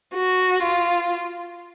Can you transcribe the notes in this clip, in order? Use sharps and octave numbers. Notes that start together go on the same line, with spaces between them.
F#4
F4